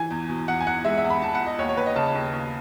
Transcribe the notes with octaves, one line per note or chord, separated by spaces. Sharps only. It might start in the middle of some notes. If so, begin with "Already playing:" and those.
Already playing: E3 G#5
E2
B2
E2 F#5
G#5
E2 F#5
G#3 E5
E5
E2
B5
E2 A5
F#5
E2
D#5
D#2 C#5
C#5
D#2 B4
D#5
C#3 A5
D#2
D#2